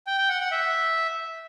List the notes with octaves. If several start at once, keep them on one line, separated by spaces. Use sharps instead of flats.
G5
G5
F#5
F#5
E5